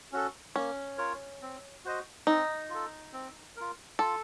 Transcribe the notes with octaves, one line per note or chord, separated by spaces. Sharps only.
C#4 F#4 A4
A#3 C#4
F4 A#4 C#5
C4
F#4 C5 D#5
C4 D#4
F4 A4
C4
F4 A#4
F4 A4